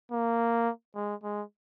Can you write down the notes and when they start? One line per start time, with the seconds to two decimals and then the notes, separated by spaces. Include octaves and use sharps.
0.12 A#3
0.95 G#3
1.23 G#3